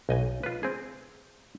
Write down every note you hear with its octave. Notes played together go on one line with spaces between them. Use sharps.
B1 D#5 G#5
F4 B4
C4 G#4